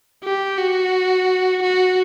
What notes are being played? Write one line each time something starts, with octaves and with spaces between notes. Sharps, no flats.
G4
F#4
F#4